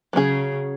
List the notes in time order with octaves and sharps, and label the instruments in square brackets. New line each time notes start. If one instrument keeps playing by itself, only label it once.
[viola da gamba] C#3 [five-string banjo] F#3 C#4 G#4